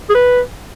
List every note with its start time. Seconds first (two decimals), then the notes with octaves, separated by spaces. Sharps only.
0.10 G#4
0.15 B4